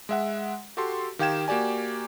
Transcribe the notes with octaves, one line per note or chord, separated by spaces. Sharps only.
G#3 E5 F#5
F#4 G4 A4 C6
D#3 G4 F5 G5 G#6 E7
A#3 F#4 G4 D5 G#5